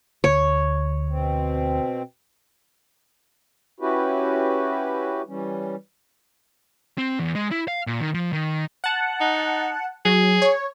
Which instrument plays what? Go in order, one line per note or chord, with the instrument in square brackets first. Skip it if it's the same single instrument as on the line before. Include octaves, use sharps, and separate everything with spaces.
[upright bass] D2 [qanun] C#5
[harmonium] B2 C4
C#4 E4 F#4 G4 B4
E3 G3 C#4
[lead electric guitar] C4
E2
G#3
E4
F5
A#2
D#3
F3
D#3
[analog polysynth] F#5 A5
[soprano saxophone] D#4
[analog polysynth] F#3 [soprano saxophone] G#4
[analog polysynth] C#5